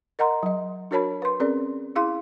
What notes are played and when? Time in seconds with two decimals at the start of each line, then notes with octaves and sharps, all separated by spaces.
0.19 A#4 D#5 F#5 A#5 C6
0.43 F#3 D#5
0.91 D4 F#4 A#4 C#5 A5 B5
1.22 B4 C6
1.40 C4 C#4 G#4 A#4 D5
1.96 E4 G#4 F5 C6